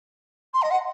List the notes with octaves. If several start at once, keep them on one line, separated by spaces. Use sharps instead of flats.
C6
D#5
F#5